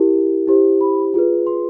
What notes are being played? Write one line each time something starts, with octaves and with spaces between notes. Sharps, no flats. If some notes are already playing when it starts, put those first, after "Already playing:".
Already playing: E4 G4 A#4
E4 G4 C5
B5
F4 G#4 B4
C6